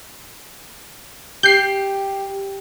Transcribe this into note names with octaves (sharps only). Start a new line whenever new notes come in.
G4 G6 C7